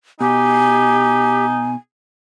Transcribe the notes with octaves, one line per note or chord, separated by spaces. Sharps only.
B2 D#4 G4 G#5